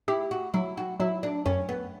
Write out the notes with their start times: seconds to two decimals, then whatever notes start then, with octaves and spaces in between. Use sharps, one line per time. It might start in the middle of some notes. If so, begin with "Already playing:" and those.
0.08 E4 G4
0.31 F#4
0.54 F#3 E4
0.77 F#4
1.00 F#3 E4
1.23 D4
1.46 F#2 C#4
1.69 B3